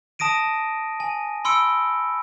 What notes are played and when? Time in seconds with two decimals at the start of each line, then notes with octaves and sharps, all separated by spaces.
0.19 A5 D#6 A#6 D7 D#7
1.00 G#5
1.45 B5 C6 E6 C#7 D7